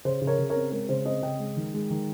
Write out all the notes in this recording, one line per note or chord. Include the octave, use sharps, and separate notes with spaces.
C#3 C5
C#3
A#4 C#5
C#3
A#4 C#5
C4
G#3 A#4
C#3 C5
C4 C5 D#5
C#3 D#5 G5
G#3
D#3
G#3
D#3